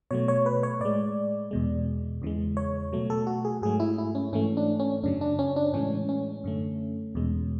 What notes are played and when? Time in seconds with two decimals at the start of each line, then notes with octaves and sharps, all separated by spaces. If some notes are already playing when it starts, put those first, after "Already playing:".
0.11 B2 F#3 A3 C#5
0.28 C#5
0.46 B4
0.63 C#5
0.80 A2 G#3 D5
1.51 E2 B2 G#3
2.22 E2 C#3 E3 G#3
2.57 C#5
2.92 B2 F#3 A3
3.10 A4
3.27 F#4
3.45 G#4
3.62 G#2 F#3 A3 G#4
3.80 E4
3.98 E4
4.15 C#4
4.32 G#2 E3 A3 C#4
4.57 D4
4.79 C#4
5.03 F#2 C#3 F#3 D4
5.21 D4
5.39 C#4
5.56 D4
5.73 A2 E3 G#3 C#4
6.09 C#4
6.44 F#2 D3 A3
7.15 E2 B2 G#3